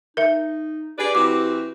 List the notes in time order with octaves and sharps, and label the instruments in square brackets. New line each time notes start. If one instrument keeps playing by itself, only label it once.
[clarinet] D#4 [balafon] A#4 E5
[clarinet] G4 [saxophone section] G#4 B4 D5
[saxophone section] E3 C4 F#4 [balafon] D6